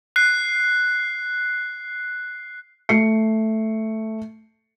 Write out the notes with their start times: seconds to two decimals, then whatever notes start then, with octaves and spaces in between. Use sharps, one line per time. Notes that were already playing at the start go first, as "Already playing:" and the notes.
0.16 F#6 C7
2.89 A3 C7 C#7